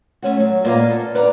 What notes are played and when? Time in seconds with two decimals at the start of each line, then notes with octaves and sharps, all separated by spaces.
0.22 A3 C#4 F#4
0.40 F#3
0.65 A#2 A#3 B4 D#5 F5 A#5
0.90 A4
1.15 B4 D5 F5 A#5